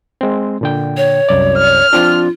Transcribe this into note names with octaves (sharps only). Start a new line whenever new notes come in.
G#3 C4
A#2 D3 G5
C#5
C2 F#2 D5
F6
F3 C4 D4 F4